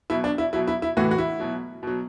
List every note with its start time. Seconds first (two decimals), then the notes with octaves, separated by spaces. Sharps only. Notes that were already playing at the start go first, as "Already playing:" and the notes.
0.10 B2 F#3 E4
0.24 D4
0.38 E4
0.53 B2 F#3 E4
0.67 E4
0.82 E4
0.97 A2 E3 F#4
1.11 F#4
1.18 E4
1.40 B2 F#3
1.83 B2 F#3